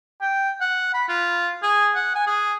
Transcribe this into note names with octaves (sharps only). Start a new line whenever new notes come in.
G5
F#5
B5
F4
G#4
F#5
G#5
G#4